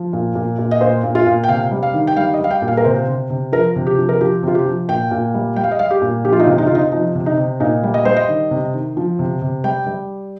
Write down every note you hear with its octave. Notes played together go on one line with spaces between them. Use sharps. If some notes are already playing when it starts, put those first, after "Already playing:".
Already playing: F3
A#2
A#2
A#2
D#5
A#2 C5
A#2
F4
A#2
G5
C3 F5
G3
F5
D#3
G5
G3 F5
D#5
G3 F5
G5
A#2
F5
A#4
C3 C5
C3
C3
F3 A#4
C3
G4
F3
A#4
F3 G4
C3 F4
G4
F3
A#2 G5
A#2
G3
G3 G5
F5
D#5
G3 F5
G4
A#2
F3 G4
F4
D#4
C3 F4
D#4
C3 F4
D#4
F3 D#4
C3
D#4
C3
A#2 D#4
G3
D#5
G3 C5
D#5
D#3
C3
D#3
F3
C3
C3
G3 G5
G3